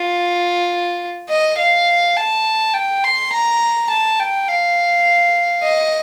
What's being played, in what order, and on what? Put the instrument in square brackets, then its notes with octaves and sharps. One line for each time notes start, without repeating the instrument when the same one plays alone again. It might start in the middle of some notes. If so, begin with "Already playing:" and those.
Already playing: [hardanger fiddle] F4
D#5
F5
A5
G5
C6
A#5
A5
G5
F5
D#5